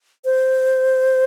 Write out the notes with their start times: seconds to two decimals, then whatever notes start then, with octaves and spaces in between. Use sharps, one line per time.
0.25 C5